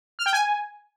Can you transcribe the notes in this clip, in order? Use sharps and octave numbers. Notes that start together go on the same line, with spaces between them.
F6
G5
G#5